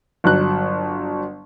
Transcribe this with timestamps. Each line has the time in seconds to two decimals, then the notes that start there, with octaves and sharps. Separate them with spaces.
0.24 G1 F#3 F#6